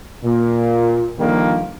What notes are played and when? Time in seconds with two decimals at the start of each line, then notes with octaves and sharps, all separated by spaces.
0.25 A#2
1.20 D3 D#3 F3 G3 A#3